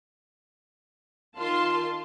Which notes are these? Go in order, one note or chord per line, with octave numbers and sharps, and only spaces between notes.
D#3 F4 F5 A5 C6